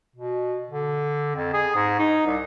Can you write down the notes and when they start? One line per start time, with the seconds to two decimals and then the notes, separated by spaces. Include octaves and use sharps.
0.16 B2
0.70 D3
1.36 F2
1.54 G#4
1.76 G#2
1.99 D#4
2.26 C2